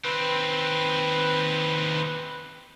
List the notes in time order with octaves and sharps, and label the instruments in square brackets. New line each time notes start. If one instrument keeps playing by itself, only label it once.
[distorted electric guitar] D#2 C4 [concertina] B4